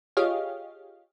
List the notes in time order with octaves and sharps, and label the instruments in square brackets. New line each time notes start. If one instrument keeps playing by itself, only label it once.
[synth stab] F4 G4 G#4 C#5 D#5 F5